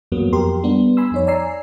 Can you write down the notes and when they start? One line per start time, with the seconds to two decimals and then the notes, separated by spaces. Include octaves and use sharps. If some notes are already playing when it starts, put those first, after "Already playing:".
0.12 E2 G2 F#3 A#3 B3
0.33 F2 G4 A#4 C6
0.63 G3 B3 D4
0.97 G#5 B5 C6 E6
1.12 F2 D#4 C#5
1.27 D5 G#5 A#5 E6 C7